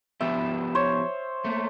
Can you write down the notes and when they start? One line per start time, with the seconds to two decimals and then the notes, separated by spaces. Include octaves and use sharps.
0.21 F3 B3 G4 E5
0.75 C5 C#5
1.45 A3 A#3